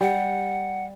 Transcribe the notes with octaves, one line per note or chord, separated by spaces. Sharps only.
G3 F#5